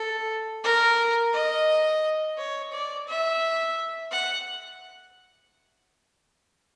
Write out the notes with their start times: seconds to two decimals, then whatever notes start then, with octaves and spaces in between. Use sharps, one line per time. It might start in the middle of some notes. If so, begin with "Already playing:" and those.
Already playing: A4
0.64 A#4
1.33 D#5
2.38 C#5
2.72 D5
3.07 E5
4.11 F#5